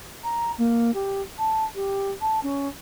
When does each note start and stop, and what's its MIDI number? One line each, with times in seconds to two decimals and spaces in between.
0.24 0.52 82
0.58 0.93 58
0.94 1.22 67
1.39 1.64 81
1.75 2.11 67
2.21 2.40 81
2.43 2.68 61